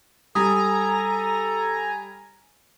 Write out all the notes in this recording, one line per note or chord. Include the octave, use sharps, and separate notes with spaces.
G3 A4 G#5 A#5 D#6